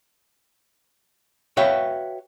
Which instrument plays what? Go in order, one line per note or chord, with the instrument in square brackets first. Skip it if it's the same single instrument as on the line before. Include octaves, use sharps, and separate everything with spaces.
[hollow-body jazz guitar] F#4 B4 C#5 E5 F5 G5